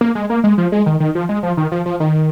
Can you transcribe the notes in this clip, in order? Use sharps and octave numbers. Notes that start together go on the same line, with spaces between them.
A#3
G#3
A#3
G#3
F3
G#3
D#3
D#3
F3
G#3
F3
D#3
F3
F3
D#3